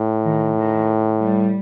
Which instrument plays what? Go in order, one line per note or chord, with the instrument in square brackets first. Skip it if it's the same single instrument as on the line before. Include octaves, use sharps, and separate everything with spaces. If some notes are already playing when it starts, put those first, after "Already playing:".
Already playing: [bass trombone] A2
[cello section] D#3
D#3
G3